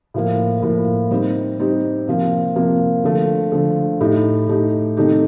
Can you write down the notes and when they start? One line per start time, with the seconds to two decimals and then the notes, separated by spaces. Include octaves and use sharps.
0.14 A2 F3 A#3
0.62 A2 F3 A#3
1.11 G3 C4 D#4 G4
1.59 G3 C4 D#4 G4
2.08 C3 F3 A#3
2.56 C3 F3 A#3
3.04 D3 F3 A3
3.52 D3 F3 A3
4.01 A2 A3 D#4 G4
4.48 A2 A3 D#4 G4
4.97 C3 D#3 A3 D#4 G4